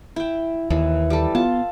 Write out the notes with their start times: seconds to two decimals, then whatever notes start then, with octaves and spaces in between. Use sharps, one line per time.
0.16 E4 G5
0.70 D#2 E3
1.10 G3 A4
1.35 B3 F4 A5